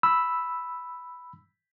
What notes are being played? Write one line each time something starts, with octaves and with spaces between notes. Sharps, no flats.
B5 E6